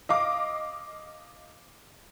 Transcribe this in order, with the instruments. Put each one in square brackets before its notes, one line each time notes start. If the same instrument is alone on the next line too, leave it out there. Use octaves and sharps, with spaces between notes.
[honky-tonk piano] D#5 F5 D6